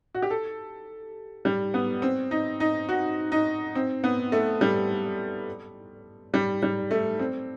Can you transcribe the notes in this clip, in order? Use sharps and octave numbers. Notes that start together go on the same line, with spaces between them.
F#4
G4
A4
G3
B3
C4
D#4
D#4
F#4
D#4
C4
B3
A3
G3
G3
G3
A3
C4